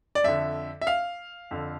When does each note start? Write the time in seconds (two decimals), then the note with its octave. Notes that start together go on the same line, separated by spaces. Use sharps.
0.15 D5
0.24 F2 D3 E5
0.81 E5
0.87 F5
1.51 F2 D3